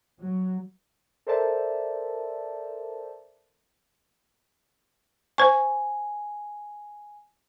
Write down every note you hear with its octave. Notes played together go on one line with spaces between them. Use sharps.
F#3
A4 A#4 C5 D5 E5 A5
C5 G#5 C#6